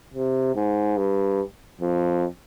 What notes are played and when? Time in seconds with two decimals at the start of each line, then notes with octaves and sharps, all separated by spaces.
0.14 C3
0.55 G#2
0.97 G2
1.81 F2